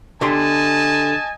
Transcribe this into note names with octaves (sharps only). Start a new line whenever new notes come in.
D3 G4 D#5 G#5 A5 C6